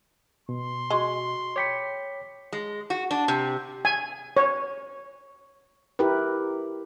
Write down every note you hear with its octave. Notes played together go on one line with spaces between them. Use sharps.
B2 C6
G#3 F#4 C#6 G7
C#5 G5 B5 D6 B6 C#7
G#3
F#4
D4
C3
G#5
C#5
E4 G4 A#4 B4